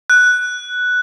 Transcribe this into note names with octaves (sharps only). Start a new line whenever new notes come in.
F#6